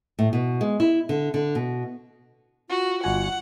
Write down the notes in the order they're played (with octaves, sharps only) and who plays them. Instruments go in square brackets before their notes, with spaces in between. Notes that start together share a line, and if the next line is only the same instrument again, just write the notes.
[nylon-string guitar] A2
B2
G#3
E4
D3
D3
B2
[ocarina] F4 [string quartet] F#4
[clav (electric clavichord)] G1 F#4 G#5 [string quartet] F#5